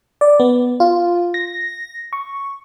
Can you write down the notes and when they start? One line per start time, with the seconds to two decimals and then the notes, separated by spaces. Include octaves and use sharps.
0.21 D5
0.40 B3
0.80 F4
1.34 A#6
2.13 C#6